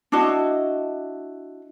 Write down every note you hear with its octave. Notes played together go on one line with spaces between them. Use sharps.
D4 E4 F#4 D#5